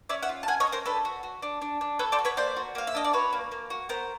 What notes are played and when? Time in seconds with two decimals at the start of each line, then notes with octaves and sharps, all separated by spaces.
0.09 C#4 D5 E5
0.23 E5 F#5
0.29 F4
0.43 A5
0.48 C#4 F#5 G#5
0.60 C#5 D#5
0.67 C#4
0.72 A#4 C5
0.86 D4 A4 B4
1.05 F#4
1.23 F#4
1.42 D4
1.62 D4
1.81 D4
1.99 A4 B4 C#5
2.12 C5 D5
2.19 F#4
2.25 B4 C#5
2.37 A#3 C5 D5
2.56 F#4
2.75 A#3 F5
2.87 E5
2.95 D4 D#5
3.05 D5
3.13 F#4 B4 C#5
3.33 A#3
3.51 A#3
3.70 F#4
3.89 B3 A#4 C5